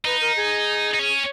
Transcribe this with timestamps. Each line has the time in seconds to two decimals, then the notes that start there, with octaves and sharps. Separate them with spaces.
0.05 D#4 B4
0.21 A#4
0.37 G#4
0.94 D#4
0.99 C#4